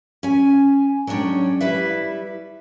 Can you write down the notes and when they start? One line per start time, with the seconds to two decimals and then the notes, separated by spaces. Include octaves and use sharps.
0.23 C#4 G#5
1.07 F#3 G#3 C#4 D4 C#5 G5
1.60 G3 E4 B4 E5